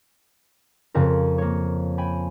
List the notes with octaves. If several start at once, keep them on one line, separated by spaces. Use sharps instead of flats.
F2 C#3 C4 A#4
A#3 C#5
G5 G#5 B5